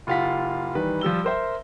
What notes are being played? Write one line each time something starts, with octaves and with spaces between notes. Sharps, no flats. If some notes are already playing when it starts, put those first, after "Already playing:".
F#1 F4 G4 F5 F#5 B6
D#3 E3 G3 B4
F3 G3 E6 G7
A#4 C5 E5